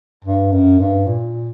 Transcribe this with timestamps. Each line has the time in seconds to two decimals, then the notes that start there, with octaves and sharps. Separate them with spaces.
0.25 G2
0.52 F#2
0.80 G2
1.07 A#2